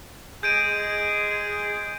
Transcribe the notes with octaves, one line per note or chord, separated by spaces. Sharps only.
G#3 G#4 G6 D7 D#7